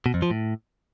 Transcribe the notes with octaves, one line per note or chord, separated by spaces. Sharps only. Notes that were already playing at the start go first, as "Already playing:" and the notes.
B2
F2
F3
A2